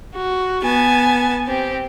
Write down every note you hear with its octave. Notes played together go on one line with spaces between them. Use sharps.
F#4
B3 G#5 A5
C4 G4